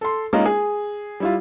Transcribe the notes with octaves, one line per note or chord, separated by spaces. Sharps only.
A4 C6
G#3 A#3 C#4 D#4 F4 A#4
G#4
G3 E4 F4